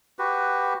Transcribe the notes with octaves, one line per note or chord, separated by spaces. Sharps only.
F#4 G4 B4